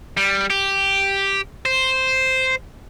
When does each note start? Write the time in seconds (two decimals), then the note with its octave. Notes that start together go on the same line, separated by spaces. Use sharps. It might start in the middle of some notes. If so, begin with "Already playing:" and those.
0.17 G3
0.50 G4
1.65 C5